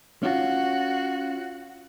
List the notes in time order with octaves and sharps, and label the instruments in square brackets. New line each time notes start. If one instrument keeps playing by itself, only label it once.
[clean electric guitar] C#4 F4 [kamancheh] F#4